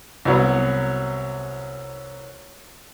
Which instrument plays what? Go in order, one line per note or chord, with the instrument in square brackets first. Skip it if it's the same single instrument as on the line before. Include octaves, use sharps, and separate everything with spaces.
[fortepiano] C2 F#3 B3